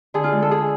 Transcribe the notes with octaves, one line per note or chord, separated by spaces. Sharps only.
D3 G#4
F4
G#3
A4
D3 G#4